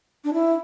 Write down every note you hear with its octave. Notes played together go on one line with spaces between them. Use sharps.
D4
E4